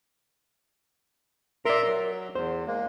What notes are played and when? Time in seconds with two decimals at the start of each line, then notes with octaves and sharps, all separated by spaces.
1.65 A#4 D5 E5 A#5 C6
1.85 F#3
2.35 E2 C5
2.67 G#3 A#3